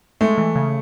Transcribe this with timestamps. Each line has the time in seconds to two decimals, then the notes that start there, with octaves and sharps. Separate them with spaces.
0.21 G#3 A3
0.38 E3
0.56 C#3